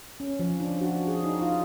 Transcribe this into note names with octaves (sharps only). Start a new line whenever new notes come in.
C#4
F3
D4
F#4
G#4
D#4
F4